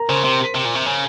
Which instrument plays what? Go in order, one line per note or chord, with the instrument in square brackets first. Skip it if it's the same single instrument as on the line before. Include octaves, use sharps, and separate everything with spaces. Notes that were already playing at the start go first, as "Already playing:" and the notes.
Already playing: [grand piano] A#4 A#5
[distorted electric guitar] C#3 [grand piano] C5 C6
[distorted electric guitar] C3
C3
A#2
C3
C#3